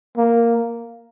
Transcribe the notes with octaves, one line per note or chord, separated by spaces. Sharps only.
A#3